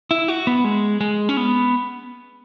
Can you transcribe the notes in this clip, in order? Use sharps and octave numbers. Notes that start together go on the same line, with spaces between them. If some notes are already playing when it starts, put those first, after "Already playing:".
E4
F#4
B3
G#3
G#3
C#4
B3